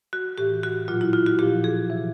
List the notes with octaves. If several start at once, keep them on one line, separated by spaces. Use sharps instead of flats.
F#4
A2 E3 G4
F#4
A#2 F#3 F4
E4
F4
F#4
A#2 F3 G4
G#4
C3 E3